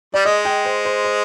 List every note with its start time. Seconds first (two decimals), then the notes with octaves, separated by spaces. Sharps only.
0.14 G3 D5
0.25 G#3 D#5
0.45 G5
0.65 C5
0.85 C5
1.04 C5